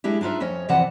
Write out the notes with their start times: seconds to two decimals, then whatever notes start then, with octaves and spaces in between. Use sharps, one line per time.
0.04 G#3 D4 E4 G4
0.21 D4 D#4 F4 B4 E5
0.40 F2 C#4 C#5 D#5
0.68 F2 C3 E3 D5 F#5 A5